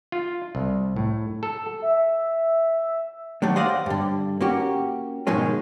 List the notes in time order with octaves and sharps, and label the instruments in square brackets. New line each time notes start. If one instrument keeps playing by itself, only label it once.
[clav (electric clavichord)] F4
C2
A2
A4
[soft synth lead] E5
[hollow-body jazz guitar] D3 D#3 F#3 A3
C5 D5 D#5 F5 F#5
G2 D3
A#3 C#4 F#4 G4
G#2 B2 D#3 F3 G#3 C#4